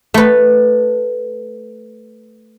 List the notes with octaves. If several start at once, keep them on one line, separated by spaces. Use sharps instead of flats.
A3 B4